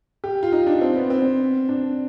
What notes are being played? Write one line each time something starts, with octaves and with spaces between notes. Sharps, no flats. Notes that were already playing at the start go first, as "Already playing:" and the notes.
G4
F4
D#4
D4
C4
B3
C4
D4